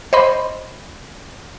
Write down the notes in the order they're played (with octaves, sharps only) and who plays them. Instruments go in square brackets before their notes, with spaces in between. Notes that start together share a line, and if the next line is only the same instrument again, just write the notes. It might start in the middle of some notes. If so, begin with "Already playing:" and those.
[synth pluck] C5 D#5 B5 C6